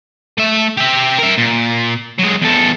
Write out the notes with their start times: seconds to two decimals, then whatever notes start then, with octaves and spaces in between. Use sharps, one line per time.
0.38 A3 E5
0.77 G4 E5
1.19 A#4 E5
1.38 A#2
2.19 F#3 G#3
2.41 E2 A4